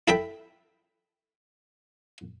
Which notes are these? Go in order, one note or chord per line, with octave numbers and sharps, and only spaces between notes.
E4 A4 E5 G5 B5